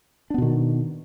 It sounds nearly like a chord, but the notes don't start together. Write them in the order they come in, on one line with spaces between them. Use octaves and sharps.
D4 B3 B2 D#3